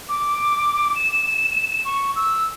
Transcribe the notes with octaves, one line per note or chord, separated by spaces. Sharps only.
D6
E7
C#6
E6